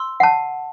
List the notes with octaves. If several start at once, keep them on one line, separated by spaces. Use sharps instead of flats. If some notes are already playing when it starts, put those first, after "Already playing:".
Already playing: C6 E6
F#5 A5